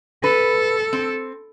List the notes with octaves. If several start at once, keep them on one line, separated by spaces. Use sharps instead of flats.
A4 B4
C4